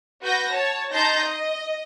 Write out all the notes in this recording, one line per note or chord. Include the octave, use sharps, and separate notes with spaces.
F#4 B4 G6 A#6
C#5 A5
D#4 A5 C6 G6 A#6
D#5